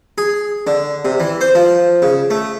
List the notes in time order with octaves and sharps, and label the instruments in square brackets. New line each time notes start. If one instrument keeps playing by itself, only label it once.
[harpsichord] G#4
D3
C3
E3
C5
F3
C#3
A3